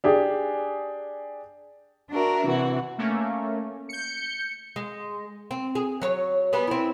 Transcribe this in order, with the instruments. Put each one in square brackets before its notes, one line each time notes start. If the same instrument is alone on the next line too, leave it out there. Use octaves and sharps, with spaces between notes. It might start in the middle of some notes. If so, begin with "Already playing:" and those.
[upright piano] D4 G4 G#4
[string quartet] D4 F#4 A#4 E5
C3 E3 F#4
[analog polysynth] A3 A#3 C#4
G6 C#7
[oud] G#3
C4
G#4
F#3 C#5
G3 B3 G#4
C4 E4